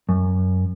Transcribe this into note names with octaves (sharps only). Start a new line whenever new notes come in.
F#2